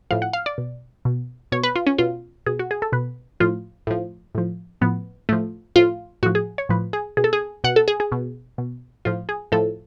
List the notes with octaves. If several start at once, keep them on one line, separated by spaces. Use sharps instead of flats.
A2 F3 F5
F#5
F5
D5
B2
B2
B2 C#5
B4
F4
C#4
B2 F4
B2 G#4
F#4
G#4
A4
B2 B4
A2 F3 F4
A2 F3
A2 F3
A2 F3 B3
A2 F3 A3
A2 F3 F4
A2 F3 F#4
G#4
C#5
A2 F3 B4
G#4
B2 G#4
A4
G#4
B2 F#5
A4
G#4
G#4
B2
B2
A2 F3 F4
G#4
A2 F3 A4